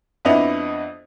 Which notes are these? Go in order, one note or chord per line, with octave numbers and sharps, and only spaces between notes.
F2 B3 D4 E4 D#5 F7